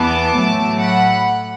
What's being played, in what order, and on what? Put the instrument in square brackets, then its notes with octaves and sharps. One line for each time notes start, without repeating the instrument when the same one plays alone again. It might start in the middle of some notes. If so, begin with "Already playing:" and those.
Already playing: [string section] E2 E3 B3 A5 D6
A2 F#3 A3
F#5 B5